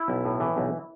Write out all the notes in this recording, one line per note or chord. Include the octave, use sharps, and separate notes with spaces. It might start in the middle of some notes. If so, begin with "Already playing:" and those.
Already playing: E4
B1
A2
E3
B1